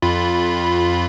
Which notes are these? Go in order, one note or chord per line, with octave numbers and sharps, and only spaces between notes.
F2 F4 B5